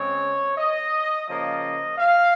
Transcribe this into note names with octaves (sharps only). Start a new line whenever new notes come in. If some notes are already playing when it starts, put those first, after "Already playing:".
Already playing: C#3 G#3 C4 C#5
D#5
C#3 F3 A#3 D#5
F5